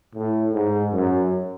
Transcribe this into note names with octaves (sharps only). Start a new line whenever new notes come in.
A2
G#2
F#2